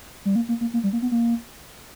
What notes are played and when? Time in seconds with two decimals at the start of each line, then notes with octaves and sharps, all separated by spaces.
0.25 G3
0.36 A#3
0.49 A#3
0.61 A#3
0.74 A#3
0.83 G3
0.93 A#3
1.02 B3
1.12 A#3